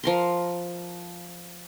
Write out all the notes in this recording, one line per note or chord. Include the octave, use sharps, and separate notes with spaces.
F3 A#4 C6